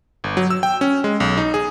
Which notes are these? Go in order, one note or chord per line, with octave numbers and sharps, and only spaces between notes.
G1
F#3
E6
G5
C#4
G#3
B1
D#4
G#4